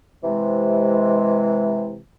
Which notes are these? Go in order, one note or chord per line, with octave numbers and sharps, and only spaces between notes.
C3 E3 G#3